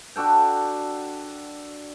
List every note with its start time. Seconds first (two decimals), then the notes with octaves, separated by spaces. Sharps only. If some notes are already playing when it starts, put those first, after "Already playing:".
0.16 D4 F#4 A4 G5